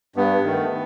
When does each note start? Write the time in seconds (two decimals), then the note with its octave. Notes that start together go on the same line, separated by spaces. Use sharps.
0.16 G2 B3
0.44 D#3 A3